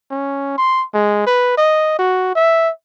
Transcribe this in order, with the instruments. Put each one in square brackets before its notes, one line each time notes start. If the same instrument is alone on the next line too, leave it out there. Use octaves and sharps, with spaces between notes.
[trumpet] C#4
C6
G#3
B4
D#5
F#4
E5